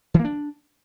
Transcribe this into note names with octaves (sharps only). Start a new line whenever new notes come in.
E3
A#3
D4